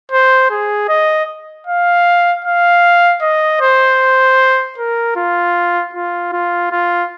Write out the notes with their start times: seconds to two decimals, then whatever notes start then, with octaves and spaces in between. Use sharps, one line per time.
0.12 C5
0.50 G#4
0.89 D#5
1.67 F5
2.45 F5
3.22 D#5
3.61 C5
4.78 A#4
5.16 F4
5.93 F4
6.33 F4
6.71 F4